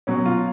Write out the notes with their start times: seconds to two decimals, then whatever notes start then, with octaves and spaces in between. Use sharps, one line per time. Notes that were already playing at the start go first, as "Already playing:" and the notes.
0.07 B2 F#3 C#4
0.26 F4